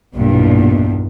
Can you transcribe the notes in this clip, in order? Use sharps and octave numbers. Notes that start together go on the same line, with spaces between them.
B1 E2 G2 A#2